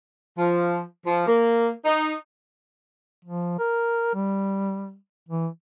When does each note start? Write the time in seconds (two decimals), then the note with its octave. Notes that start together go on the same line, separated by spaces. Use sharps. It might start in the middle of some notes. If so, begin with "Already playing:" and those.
0.38 F3
1.06 F3
1.26 A#3
1.85 D#4
3.25 F3
3.59 A#4
4.14 G3
5.28 E3